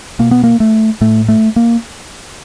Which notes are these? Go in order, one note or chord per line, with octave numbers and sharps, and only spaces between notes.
B2 A#3
B3
A#3
A3
A2 A3
A3
A#3